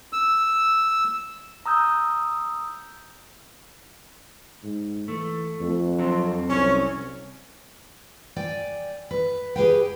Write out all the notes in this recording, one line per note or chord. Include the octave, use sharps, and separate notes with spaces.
E6
A#5 D#6 E6 G6
G#2
E3 A3
F2
F#3 C4
C2 C#4
D5 G5 G#5
B4
G4 G#4 B4 G5